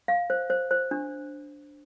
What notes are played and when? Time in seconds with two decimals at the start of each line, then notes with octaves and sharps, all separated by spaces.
0.08 F5
0.30 C5
0.50 C5
0.71 C5
0.91 D4